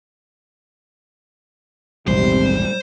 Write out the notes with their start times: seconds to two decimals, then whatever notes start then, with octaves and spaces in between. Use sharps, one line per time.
2.08 A#1 E2 G#2 C3 G3 C5